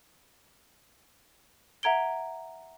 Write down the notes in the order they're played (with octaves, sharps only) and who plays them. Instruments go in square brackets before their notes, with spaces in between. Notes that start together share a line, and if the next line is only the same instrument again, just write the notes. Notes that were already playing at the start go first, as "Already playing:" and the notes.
[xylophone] E5 F#5 A#5 G#6 D7 G7